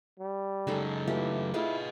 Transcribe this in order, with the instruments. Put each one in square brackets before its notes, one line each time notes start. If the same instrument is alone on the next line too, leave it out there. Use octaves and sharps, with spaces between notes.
[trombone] G3
[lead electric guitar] C#3 F#3 [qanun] G#3 D#4 A4
[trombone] E3 [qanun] A3 F4 G4
[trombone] E4 [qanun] F4 G#4 [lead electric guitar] B4 D#5